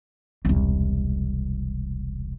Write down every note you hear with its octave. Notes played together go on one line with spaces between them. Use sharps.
E1 C2